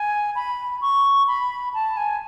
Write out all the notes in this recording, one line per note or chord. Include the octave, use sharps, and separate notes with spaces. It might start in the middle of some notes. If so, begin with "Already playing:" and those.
Already playing: G#5
B5
C#6
B5
A5
G#5